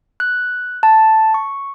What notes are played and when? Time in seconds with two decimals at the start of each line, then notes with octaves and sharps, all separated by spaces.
0.20 F#6
0.83 A5
1.34 C#6